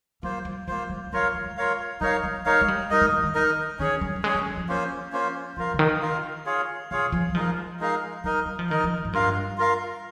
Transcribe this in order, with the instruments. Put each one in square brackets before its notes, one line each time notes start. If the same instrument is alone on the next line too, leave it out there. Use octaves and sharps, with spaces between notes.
[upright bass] G3 [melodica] A#3 F4 C5
[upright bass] G3
[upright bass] G#3 [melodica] A#3 F4 C5
[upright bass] G3
G3
[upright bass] F3 [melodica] F4 A#4 C#5 F5
[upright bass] G#3
G3
G#3
[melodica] F4 A#4 C#5 F5
[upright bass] G3 [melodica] D#4 A#4 C#5 F5
[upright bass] G3
[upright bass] G#3 [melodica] D#4 A#4 C#5 F5
[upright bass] G#3
G3
[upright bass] G#3 [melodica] D#4 A#4 D#5
[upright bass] G#3
G3
D#3
[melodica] D#4 A#4 D#5
[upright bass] D#3 [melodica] C#4 G#4 C#5
[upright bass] G3
G3
[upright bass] G#3 [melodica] C#4 G#4 C#5
[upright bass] G3
G3
F3
[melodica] A#3 C#4 F4 C5
A#3 C#4 F4 C5
[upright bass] F3 [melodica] F4 A#4 F5
[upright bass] C#3
D#3
[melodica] F4 A#4 F5
F4 G#4 C#5 F5
[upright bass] C3 [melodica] F4 G#4 C#5 F5
[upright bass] F3
G3
[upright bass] F3 [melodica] G#3 D#4 A#4 F5
[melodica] G#3 D#4 A#4 F5
[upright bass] G3 [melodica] D#4 A#4 D#5
[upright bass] G3
F3
[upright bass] D#3 [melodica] D#4 A#4 D#5
[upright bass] F3
G#2
[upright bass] G2 [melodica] F4 A#4 F5
[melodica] F4 A#4 F5